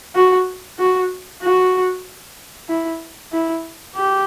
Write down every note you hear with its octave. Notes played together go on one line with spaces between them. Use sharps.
F#4
F#4
F#4
E4
E4
G4